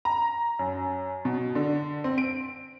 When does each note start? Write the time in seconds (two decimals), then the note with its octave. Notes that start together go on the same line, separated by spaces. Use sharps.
0.05 A#5
0.59 F#2
1.25 B2
1.55 D3
2.04 C4
2.18 D7